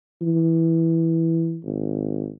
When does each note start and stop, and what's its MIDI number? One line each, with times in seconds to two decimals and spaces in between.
0.22 1.59 52
1.65 2.30 32